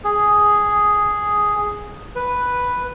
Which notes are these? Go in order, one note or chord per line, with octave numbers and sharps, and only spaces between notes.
G#4
B4